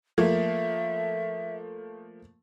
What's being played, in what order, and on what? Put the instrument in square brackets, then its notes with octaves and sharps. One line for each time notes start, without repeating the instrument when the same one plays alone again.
[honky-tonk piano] F3 A3 A#3 [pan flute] E5